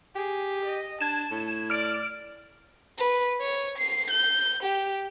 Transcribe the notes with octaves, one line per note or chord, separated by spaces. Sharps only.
G4 G#4
D#5
D4 A5 G#6 E7
A2
D5 F6 D7
B4
C#5
C7
G6
G4